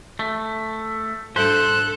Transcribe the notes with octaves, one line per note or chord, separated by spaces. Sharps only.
A3
G#2 G3 D4 A4 C5 F#6